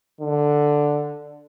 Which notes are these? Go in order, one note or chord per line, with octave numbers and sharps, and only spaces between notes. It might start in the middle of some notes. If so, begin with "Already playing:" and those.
D3